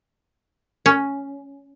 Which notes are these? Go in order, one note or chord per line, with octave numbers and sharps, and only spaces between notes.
C#4